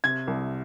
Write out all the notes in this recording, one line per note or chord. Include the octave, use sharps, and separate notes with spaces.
C3 G#6
C2